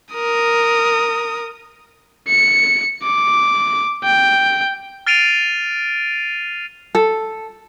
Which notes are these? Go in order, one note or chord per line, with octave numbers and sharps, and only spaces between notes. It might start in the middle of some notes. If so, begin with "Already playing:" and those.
A#4 D#6
C#7
D6
G5
F6 A6 C7 D7 D#7 F7
A4